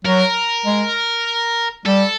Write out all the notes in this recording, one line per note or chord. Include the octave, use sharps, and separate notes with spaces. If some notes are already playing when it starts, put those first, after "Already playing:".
F#3 A#4
G#3
G3 A4